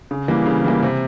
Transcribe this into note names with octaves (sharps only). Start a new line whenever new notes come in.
C#3
E3 G3 A#3
C#3
E3 G3 A#3
C3